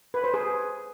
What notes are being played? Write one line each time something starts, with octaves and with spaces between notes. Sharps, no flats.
B4
C5
G#4